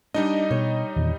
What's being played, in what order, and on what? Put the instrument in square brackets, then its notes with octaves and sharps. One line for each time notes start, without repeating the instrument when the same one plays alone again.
[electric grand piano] G3 D#4 D#5 [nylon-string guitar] D4
[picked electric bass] B2 [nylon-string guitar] C#5
[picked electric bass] E2 A#2 D#3